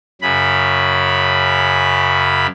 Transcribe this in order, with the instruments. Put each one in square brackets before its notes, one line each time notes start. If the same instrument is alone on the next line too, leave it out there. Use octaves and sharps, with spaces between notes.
[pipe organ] F#2 C#3 B5